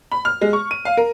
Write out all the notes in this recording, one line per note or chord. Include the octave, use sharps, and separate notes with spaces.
B5
F6
G#3
C#6
D#7
F5
A#4